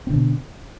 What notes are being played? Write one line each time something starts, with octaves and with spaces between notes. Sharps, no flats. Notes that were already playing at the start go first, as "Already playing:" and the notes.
B2 D3 C4